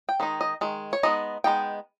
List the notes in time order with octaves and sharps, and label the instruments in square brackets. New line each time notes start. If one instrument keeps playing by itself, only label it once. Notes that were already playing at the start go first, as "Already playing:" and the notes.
[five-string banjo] G5
D#3 G#3 D#4
D#5
D#3 G#3
C#5
G#3 B3 D#4 D#5
G#3 B3 D#4 G5